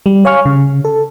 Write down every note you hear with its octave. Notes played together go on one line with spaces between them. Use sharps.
G3
C#5 F5 G#5 C#6 F6
C#3
A4